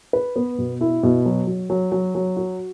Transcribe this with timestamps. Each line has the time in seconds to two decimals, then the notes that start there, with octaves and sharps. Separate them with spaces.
0.13 B4
0.36 B3
0.58 B2
0.81 E4
1.03 B2
1.26 F#3
1.47 F#3
1.70 F#3
1.92 F#3
2.15 F#3
2.37 F#4